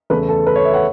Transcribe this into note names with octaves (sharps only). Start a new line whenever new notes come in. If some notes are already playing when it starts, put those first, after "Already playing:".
E2 C#3 A3 B4
A4
B4
C#5
E5
F#5